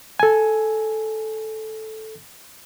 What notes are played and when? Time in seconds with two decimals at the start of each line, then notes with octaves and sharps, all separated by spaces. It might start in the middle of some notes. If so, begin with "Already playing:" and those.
0.20 A4 G#5